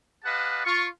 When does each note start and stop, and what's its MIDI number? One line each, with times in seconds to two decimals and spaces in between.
0.25 0.61 67
0.25 0.61 71
0.25 0.61 75
0.25 0.61 77
0.25 0.61 78
0.25 0.61 81
0.65 0.87 65
0.65 0.87 85